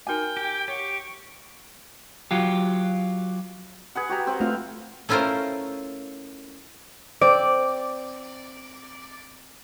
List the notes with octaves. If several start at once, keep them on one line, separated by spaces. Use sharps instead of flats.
D#4 F#4 A#4 G5 G#5
G4
G4 C#5 F#5 C#6
F#3 F4 G4
G#4 B4 F#5
F#4 G4 A#5
C4 B4 F#5
A3 C4 F4 F5
A3 C#4 E4 F4 A#4 C5
C4 D5